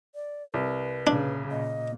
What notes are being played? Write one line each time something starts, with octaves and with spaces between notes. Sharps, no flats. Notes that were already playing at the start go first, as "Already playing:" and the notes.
D5
C2 B4
A#2 C#3 D4
A#2 D#5